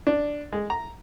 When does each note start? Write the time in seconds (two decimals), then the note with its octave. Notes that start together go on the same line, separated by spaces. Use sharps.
0.07 D4
0.52 G#3
0.70 A#5